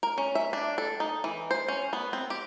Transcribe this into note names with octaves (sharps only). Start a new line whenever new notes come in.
A#4
C#4
E5
D4
A4
D#4
E3
C5
C#4
B3
C4
G4